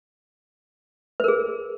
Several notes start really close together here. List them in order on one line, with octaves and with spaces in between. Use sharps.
B4 A#4 G#4